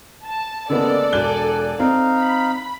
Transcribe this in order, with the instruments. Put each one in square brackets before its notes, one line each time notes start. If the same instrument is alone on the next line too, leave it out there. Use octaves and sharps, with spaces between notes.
[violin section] A5
[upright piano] C#3 A#3 B3 [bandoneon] G#3 E6 [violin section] A4 D5
[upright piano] E1 F#6 G7 [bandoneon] G#5
[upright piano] C4 [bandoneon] D#4 F5
[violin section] B5